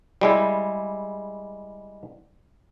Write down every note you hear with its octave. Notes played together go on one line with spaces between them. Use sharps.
G3 G#3 E4